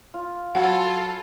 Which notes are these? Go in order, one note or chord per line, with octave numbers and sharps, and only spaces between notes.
F4
F#3 F4 F#4 A4 F#5 G#5 B5